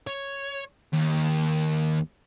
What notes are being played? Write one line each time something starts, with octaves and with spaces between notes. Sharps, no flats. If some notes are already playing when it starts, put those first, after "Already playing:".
C#5
D#2